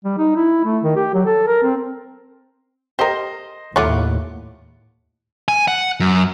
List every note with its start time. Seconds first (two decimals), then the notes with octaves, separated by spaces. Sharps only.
0.05 G3
0.18 D#4
0.36 E4
0.65 A3
0.83 D#3
0.96 G4
1.14 F#3
1.26 A4
1.47 A#4
1.63 C4
2.99 G4 A#4 C5 D#5
3.76 D#2 A2 A3 F4 C#5 F#5 B5 D6
5.48 G#5
5.68 F#5
6.00 F#2